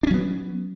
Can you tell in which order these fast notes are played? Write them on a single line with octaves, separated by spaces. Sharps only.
D4 C#4 F#3 B3